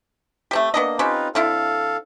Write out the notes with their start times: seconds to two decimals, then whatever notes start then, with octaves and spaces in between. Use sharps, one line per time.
0.51 A3 C4 G4
0.74 A#3 B3 D4 D#5
0.99 C4 C#4 D#4 F4 G4 B4
1.35 D3 C4 E4 A4 F5